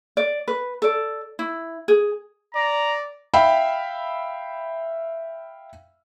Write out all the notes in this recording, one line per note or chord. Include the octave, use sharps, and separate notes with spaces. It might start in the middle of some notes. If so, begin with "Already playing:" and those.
D5
B4
A4 D5
E4
G#4
D5 A#5
E5 F5 G5 B5